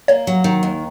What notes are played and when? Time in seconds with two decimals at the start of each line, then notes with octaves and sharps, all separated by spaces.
0.08 A#3 C#5
0.27 F#3
0.44 D#3
0.63 D#2